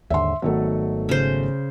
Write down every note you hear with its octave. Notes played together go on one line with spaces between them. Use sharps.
D#2 G#2 D3 E5 C6
G#1 D#3 F#3 A3 B3 A4
C#3 C5